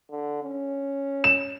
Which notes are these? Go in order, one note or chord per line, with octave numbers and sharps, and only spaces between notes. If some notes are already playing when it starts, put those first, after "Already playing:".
D3
C#4
E7